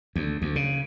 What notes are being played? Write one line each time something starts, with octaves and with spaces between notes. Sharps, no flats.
D2
D2
C#3